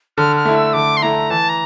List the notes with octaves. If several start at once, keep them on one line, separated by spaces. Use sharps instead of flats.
D3 F6
F6
A3 E4
E6
D3 D6
C6
A3 E4 A#5
E3 A5
A#5